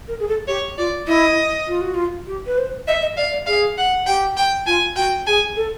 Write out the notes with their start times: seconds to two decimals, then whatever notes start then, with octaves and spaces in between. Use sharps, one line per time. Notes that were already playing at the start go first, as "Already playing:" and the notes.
0.08 A#4
0.20 G#4
0.28 A4
0.48 G4 C#5
0.78 F4 D5
1.07 E4 D#5
1.68 F4
1.81 F#4
1.94 F4
2.27 G4
2.47 B4
2.58 C5
2.88 D#5 E5
3.02 D#5
3.17 D5 F5
3.33 D5
3.47 G#4 F5
3.78 F#5
4.07 G4 G5
4.37 G5
4.67 F4 G#5
4.96 F#4 G5
5.26 G#4 G#5
5.56 A4